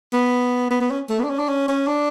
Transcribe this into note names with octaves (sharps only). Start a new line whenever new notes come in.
B3
B3
B3
C#4
A3
B3
D4
C#4
D4
C#4
C#4
D4